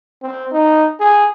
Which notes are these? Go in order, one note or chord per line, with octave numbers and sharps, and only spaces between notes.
C4
D#4
G#4